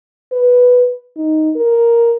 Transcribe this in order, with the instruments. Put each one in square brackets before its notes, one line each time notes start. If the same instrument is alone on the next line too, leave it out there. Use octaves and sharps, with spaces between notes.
[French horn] B4
D#4
A#4